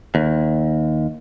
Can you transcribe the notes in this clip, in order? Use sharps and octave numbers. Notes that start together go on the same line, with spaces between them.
D#2